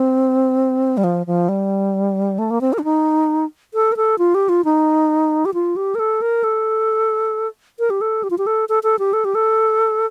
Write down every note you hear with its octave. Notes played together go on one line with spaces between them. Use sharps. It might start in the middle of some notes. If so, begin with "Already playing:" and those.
Already playing: C4
G3
F3
F3
G3
A3
A#3
C4
A#4
D4
D#4
A4
A#4
A4
F4
G4
F4
D#4
G4
F4
G4
A#4
A4
A#4
A4
A#4
G4
A4
G4
F4
G4
A4
A4
A4
G4
A4
G4
A4